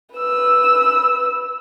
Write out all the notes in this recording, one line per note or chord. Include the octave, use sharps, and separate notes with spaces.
B4 E6